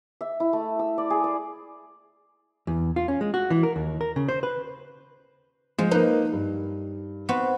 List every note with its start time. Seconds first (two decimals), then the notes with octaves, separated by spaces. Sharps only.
0.21 E5
0.40 E4
0.53 A3
0.79 E6
0.98 D5
1.10 G#4
1.24 D5
2.67 E2
2.96 F4
3.08 C#4
3.21 G#3
3.34 F#4
3.50 E3
3.63 A#4
3.76 D#2
4.01 A#4
4.16 C#3
4.28 C5
4.43 B4
5.78 F3 G#3
5.91 A#3 D#4 B4
6.32 G2
7.29 B3 C4 F#4